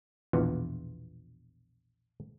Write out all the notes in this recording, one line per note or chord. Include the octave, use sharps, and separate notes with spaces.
A#1 E2 B2 E3 F4 F#5